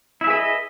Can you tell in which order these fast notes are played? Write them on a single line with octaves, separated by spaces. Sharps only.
E4 E5 G#4 B4 D#5